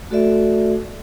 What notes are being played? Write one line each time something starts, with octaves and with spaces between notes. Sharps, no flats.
A3 F#4 A4 D5 E5